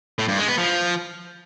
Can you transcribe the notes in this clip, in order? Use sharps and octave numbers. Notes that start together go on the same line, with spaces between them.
A2
G2
G#3
B3
F3